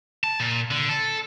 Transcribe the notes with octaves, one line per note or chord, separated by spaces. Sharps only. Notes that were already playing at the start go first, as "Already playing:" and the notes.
A5
A#2
D3
A4